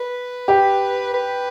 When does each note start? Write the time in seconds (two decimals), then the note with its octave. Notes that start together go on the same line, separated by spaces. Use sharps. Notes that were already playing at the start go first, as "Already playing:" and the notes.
Already playing: B4
0.48 G4
1.14 B4